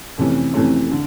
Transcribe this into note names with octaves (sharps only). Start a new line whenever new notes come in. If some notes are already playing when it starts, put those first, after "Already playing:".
F2 C3 E3 A3 C#4
F2 C3 E3 A3 C#4
D3